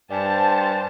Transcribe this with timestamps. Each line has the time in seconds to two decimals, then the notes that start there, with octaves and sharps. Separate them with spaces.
0.11 G2 C5 D5 G#5 A5